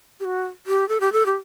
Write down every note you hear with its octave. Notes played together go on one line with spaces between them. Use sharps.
G4
F#4
G4
A4
G4
A4
G4